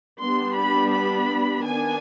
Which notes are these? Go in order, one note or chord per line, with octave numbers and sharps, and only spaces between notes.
G3 B3 D4 C6
B5
B5
D#3 B3 D4 G#5